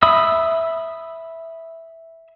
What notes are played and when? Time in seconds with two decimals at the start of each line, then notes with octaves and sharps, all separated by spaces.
0.03 E5 B5 D#6 E6